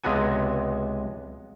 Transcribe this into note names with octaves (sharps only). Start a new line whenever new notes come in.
C#2 C3 G#3 B3 F#4 G#5